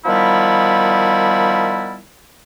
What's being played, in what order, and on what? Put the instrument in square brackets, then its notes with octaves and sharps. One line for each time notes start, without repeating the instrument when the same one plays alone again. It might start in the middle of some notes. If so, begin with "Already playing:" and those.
[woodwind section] D#3 F3 G3 B3 E4